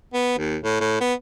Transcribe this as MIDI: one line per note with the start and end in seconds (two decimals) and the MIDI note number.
0.14 0.38 59
0.38 0.57 39
0.63 0.79 45
0.80 0.99 45
1.00 1.13 59